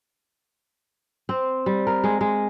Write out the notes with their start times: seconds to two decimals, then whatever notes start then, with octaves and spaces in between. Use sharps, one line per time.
1.29 C4
1.66 G3
1.87 A#4
2.04 G#3
2.21 G#3